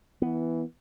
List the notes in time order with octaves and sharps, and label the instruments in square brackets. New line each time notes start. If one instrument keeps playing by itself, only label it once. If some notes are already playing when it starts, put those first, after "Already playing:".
[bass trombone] E3 [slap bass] B3